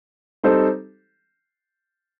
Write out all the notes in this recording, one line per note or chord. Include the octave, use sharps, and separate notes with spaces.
G3 C4 D#4 A4 C5